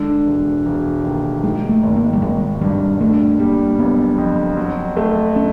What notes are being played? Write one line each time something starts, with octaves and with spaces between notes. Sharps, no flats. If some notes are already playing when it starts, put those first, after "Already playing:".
Already playing: D3 G#3
E1
E1
D#2
D#3 G#3
A3
G#1
A#3
G3
G#1 G#3
G2 G3
D3 A3
G3 A#3
F#1 B3
F2
F#3
A3
C#4